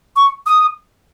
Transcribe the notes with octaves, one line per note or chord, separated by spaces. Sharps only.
C#6
D#6